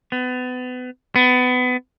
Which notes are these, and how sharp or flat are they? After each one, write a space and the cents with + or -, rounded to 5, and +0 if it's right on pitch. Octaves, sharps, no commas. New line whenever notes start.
B3 +30
B3 +25